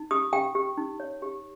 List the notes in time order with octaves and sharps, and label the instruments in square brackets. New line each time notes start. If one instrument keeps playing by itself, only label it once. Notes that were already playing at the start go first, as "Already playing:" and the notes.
Already playing: [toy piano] D#4
G4 D#6
G4 G5
G4
D#4
C#5
G4